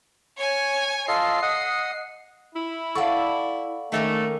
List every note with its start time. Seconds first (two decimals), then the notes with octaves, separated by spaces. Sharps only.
0.37 C#5 G#5
1.08 F4 A4 D#5 C7
1.42 D#5 F#5 D#6
2.54 E4
2.95 A4 D5 F5 F#5 C#6
3.92 D#3 A3 A#3 C#4